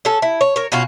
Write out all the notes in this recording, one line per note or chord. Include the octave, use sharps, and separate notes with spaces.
C#4 A4
E4
C#5
A#4 C#5
B2 C#4 F4 F#4